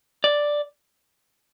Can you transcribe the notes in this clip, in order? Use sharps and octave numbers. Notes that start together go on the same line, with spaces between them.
D5